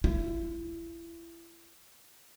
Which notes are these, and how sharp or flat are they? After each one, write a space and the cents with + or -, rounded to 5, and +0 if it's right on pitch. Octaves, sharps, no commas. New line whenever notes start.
E4 +30